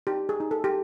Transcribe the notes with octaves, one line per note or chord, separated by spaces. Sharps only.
D#4 G4
G#4
D#4
A4
G4